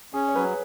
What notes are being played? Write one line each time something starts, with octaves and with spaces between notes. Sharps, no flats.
C#4 G#4
C#5
F#3 B4